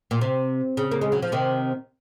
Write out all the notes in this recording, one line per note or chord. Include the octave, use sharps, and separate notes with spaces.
A#2
C3
C#3
A#3
G#3
F#3
F3
C3 D#3